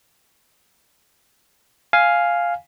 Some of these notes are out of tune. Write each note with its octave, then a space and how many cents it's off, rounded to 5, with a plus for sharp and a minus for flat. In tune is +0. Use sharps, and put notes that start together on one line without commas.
F5 +0 G#5 +0